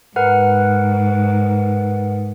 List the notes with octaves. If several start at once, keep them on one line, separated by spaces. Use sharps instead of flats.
G#2 A#4 B4 F#5